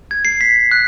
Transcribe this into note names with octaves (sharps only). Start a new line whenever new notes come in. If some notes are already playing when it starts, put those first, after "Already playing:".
G#6
C7
B6
F#6